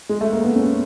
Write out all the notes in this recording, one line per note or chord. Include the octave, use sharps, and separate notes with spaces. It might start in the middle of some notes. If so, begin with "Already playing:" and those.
G#3
A3
A#3
B3
C#4